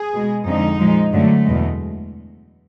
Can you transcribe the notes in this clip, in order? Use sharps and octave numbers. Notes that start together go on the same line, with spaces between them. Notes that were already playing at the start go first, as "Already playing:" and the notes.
Already playing: G#4
B2 G#3
F2 D3 F3 G#3 D#4
A#2 F3 G#3
F#2 D3 F#3 A3
E2 B2 G#3